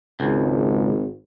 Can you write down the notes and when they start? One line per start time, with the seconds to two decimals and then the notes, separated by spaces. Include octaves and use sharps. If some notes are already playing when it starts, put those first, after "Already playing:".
0.20 G#1 C#2